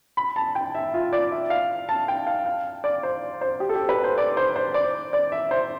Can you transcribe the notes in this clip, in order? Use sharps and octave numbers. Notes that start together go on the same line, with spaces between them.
B5
A5
G5
E5
F4
D5
E5
F5
A5
G5
F5
F5
D5
C5
C5
G4
A4
G4
B4
C5
D5
C5
C5
D5
D5
E5
C5